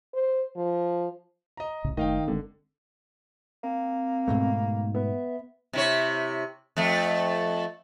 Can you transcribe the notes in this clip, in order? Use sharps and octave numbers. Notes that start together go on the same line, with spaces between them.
C5
F3
D#5 A#5
C2 A2 C#3
F#1 D#3 A3 D#5 F5 G5
F#1 D3 G#3 C4
A#3 C4
G#2 B2 A3
B3 E5
C3 E4 C#5
F2 A3